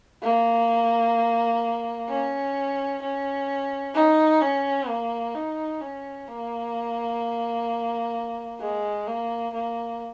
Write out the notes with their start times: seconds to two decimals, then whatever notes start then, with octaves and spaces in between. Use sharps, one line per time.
0.22 A#3
2.08 C#4
3.02 C#4
3.95 D#4
4.42 C#4
4.88 A#3
5.34 D#4
5.81 C#4
6.28 A#3
8.60 G#3
9.07 A#3
9.53 A#3